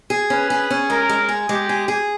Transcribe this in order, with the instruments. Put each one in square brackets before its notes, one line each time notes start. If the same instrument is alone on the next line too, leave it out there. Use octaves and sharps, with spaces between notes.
[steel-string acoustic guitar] G#4
[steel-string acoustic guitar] C#4 [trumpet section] B4
[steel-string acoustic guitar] G#4
C#4
[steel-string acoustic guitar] G#3 [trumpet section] A#4
[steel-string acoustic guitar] G#3
G#4
[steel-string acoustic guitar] G#3 [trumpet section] G4
[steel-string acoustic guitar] G#4
G#4